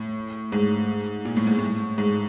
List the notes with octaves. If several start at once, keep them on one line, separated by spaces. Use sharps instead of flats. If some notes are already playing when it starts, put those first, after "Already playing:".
Already playing: A2
G#2
A#2
A2
G#2
A2
G#2